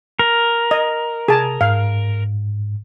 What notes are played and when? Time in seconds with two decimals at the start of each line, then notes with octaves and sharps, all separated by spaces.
0.19 A#4
0.71 D#5
1.28 C3 G#4 A5
1.61 G#2 F5